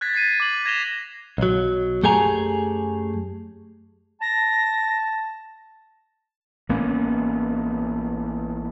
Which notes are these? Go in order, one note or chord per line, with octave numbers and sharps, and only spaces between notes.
F#6 G#6 A6 B6
G#6 A6 C7 D#7
D6 F#7
G#6 A#6 E7 F7 G7
B1 F#3
F#2 A3 G4 G#4 G#5 A#5
A5 A#6
A1 A#3 B3 C#4